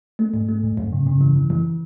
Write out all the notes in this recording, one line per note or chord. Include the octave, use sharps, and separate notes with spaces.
A3
G#2
A3
G#2
F#2
C#3
C#3
E3
E3
E3